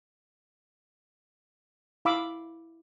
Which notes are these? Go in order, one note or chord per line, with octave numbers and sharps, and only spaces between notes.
E4 F5 B5 D6 E6